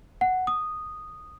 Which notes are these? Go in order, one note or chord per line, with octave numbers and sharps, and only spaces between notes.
F#5
D#6